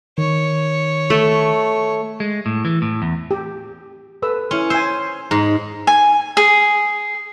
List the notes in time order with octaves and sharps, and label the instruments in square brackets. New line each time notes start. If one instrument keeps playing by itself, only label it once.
[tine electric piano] D#3 [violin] C#5
[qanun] A3
[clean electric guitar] G#3
A2
E3
A2
E2
[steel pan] G4
A4 B4 E6
[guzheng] C#4 [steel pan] E4 C6
[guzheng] C5 [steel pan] G#5 E6
[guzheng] G#2 [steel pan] A#5
[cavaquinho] G#5
G#4